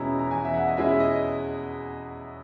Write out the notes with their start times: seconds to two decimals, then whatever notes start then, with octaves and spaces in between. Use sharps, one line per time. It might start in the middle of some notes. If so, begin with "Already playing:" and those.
Already playing: E2 B2 G#3 C#4 E4 A#5
0.19 A#5
0.31 E2 G#5
0.45 E5
0.54 F#5
0.68 D#5
0.77 B2 G#3 C#4 E4 E5
1.00 D#5